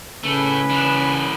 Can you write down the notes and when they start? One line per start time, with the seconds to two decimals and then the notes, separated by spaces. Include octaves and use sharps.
0.23 A2 C#3 A3 B4 G#5
0.69 E3 D4